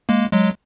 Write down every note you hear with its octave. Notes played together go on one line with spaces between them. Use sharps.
G#3 A#3
F#3 G#3